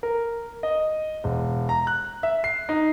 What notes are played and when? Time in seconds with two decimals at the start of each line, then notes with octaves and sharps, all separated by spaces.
0.03 A#4
0.63 D#5
1.24 E1
1.69 A#5
1.87 F#6
2.23 E5
2.44 C7
2.69 D#4